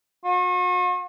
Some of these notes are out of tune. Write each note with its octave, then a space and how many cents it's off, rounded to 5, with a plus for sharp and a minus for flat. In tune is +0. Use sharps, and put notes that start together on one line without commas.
F#4 -45